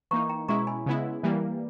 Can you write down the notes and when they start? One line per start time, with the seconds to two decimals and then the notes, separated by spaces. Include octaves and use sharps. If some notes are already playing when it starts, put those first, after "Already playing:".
0.11 E3 A#3 D#4 A#5 C#6
0.29 G5 A#5
0.48 B2 G#3 C#4 E4 A#5 C#6
0.67 G#5 B5
0.86 C#3 G#3 B3 E4
1.23 E3 G3 A#3